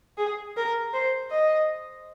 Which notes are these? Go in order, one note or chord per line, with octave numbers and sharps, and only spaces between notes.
G#4
A#4
C5
D#5